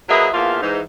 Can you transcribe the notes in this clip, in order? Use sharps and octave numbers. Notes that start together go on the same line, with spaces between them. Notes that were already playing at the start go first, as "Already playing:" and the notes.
F#3 A#3 G#4 B4 D#5 E5
E2 F3 A#3 F4 E5 F5
G#2 E3 D#4